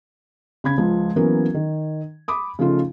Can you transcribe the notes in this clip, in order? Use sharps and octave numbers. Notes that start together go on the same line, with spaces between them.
C#3 B5 G#6
C#2 F3
E3 F#3 A#3 B3 C#4 A#4
D#3
B5 D6 D#6
C#3 F3 A3 D#4 F4